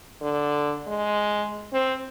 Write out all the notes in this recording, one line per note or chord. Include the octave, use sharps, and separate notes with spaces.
D3
G#3
C4